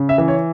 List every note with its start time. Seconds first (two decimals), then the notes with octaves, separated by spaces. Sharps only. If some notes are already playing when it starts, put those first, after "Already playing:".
Already playing: C#3
0.09 E5
0.18 E3
0.28 C#5